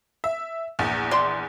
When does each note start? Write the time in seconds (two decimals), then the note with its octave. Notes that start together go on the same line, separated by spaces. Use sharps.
0.24 E5
0.79 A#1 E2
1.11 D5 C6